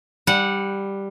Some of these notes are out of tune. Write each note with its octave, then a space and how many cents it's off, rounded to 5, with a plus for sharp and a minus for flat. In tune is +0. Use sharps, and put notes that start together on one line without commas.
G3 +5 F#5 -15